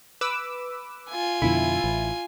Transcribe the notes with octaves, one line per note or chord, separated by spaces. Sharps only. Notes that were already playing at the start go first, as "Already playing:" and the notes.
B4 D6 E6
F4 G#5
F2 B2 D3 E4
A1